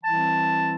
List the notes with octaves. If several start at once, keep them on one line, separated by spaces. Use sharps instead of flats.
E3 G3 C4 E4 A5